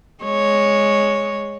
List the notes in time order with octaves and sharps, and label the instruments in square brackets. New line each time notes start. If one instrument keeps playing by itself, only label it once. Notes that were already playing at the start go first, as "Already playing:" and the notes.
[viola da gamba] G#3 C#5